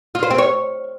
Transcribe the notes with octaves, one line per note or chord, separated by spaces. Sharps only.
F4
C5
C4
C#5